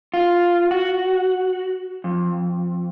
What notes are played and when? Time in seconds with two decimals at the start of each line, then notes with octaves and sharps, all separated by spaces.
0.14 F4
0.71 F#4
2.04 F2